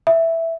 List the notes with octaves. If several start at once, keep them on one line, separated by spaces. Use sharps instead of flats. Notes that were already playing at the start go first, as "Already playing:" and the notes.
E5